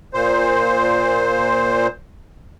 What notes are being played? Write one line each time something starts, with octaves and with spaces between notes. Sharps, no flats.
A#2 C5